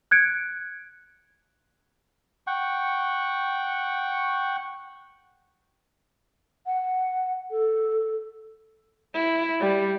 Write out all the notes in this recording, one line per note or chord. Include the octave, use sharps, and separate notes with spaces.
F#6 G#6 C#7 D7
F#5 G5 C#6
F#5
A4
E4
G3